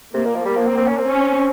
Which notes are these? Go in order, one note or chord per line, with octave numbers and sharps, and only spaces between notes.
C3 A#3
A#2
F3
G3 A#3
F3
C4
C4
C#4
C4
C#4